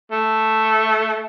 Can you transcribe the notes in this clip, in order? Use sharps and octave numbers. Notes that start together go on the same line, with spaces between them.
A3